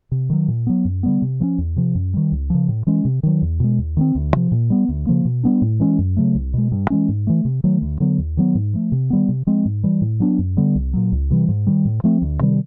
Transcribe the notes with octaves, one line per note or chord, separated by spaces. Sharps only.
C3
D#3 F#3
A#2
F#3 B3
F#2
D3 G3 B3
C3
F3 A3 C#4
E2
C3 F3
F#2
D#3 G3
C#2
C#3 F3
A2
E3 G#3 C#4
C3
D#3 F#3
E2
B2 G#3
D#2
D#3 G#3 C4
D2
C3 F3
A#2
G3 B3
D2
C#3 F3 A#3
B2
G3 B3 D4
A2
E3 G#3 C#4
F#2
C#3 F#3 A3
C2
B2 G#3
G2
E3 G#3 C#4
G#2
E3 A3
C3
D#3 F#3 A3
D2
D3 F#3 B3
D#2
D#3 F#3 B3
G#2
F3 A3
C3
D#3 G3 B3
C3
F3 G#3 C4
G#2
E3 G3
A2
F#3 B3 D4
F#2
D3 G3 B3
C2
A#2 F#3
C#2
C3 E3 G3
G#2
D#3 G3
A2
F3 A3 C4
D2
C3 D#3 G3